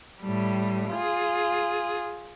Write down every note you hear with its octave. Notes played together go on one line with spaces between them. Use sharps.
A2 G3
F4 G#4